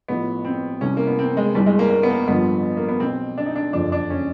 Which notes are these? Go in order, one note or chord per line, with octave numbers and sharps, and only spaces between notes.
A1 A2 F3 B3
C4
C2 C3 E3 C#4
A#3
B3
C4
G#3
G1 G2 E3 G3
G#3
A#3
A#3
B3
A#3
A1 G2 D3 F3 B3
A#3
B3
B1 B2 C4
D4
D#4
D4
F#1 F2 D3 F3 D4
D4
C#4